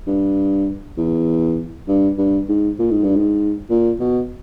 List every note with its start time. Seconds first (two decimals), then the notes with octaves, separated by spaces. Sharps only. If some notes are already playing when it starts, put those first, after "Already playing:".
0.07 G2
0.98 E2
1.88 G2
2.18 G2
2.49 G#2
2.79 A#2
2.91 G#2
3.04 G2
3.16 G#2
3.70 A#2
3.99 B2